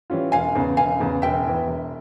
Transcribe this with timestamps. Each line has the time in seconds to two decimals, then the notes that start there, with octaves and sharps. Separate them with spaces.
0.10 E3 G3 C#4 F4
0.32 E1 F5 G#5
0.55 E2 C#3
0.77 E1 F5 G#5
1.00 E2 C#3
1.22 E1 E5 G5
1.45 E2 E3
1.67 E1